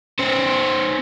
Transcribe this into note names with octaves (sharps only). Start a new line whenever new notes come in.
C#4 C5